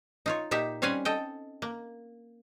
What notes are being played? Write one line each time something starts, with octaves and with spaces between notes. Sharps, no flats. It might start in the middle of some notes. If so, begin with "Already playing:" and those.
D#4 F4 C#5
A#2 D#4 G4 E5
G3 C4 C#4 F5 F#5 G#5
A4 D#5 G5
A#3